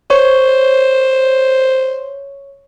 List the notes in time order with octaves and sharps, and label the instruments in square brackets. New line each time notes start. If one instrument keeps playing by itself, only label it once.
[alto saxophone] C5 [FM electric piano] C#5